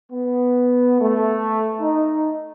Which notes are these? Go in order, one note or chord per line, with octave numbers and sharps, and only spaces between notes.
B3
A3
D#4